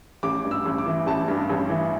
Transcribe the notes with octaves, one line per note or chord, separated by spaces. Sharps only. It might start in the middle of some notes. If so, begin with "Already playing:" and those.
A1 D6
G2
E6
A1
D6
E3
A1 A5
G2
A1
E3